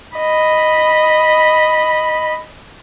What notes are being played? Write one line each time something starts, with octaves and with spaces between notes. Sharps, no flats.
D#5 B5